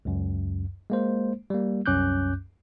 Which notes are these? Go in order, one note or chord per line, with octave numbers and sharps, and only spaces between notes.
C#2 F#2
G#3 A#3 C5
G3 A#3
C2 F#2 C#4 D6 F#6 G6